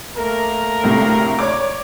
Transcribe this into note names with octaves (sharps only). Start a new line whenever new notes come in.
A3 A#3 A#4
D2 A2 C3
C#5 D5 D6